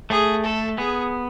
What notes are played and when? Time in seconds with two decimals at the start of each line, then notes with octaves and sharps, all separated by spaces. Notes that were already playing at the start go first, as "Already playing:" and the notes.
0.10 A3 G#4
0.45 A4
0.78 B3 G#4